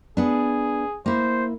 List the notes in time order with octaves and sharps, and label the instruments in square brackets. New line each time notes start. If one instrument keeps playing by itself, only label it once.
[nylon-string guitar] B3 D4 [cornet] G#4
[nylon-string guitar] A#3 E4 [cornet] C5